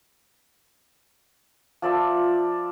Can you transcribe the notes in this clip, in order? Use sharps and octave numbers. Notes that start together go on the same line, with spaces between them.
F3 D5 E5 A5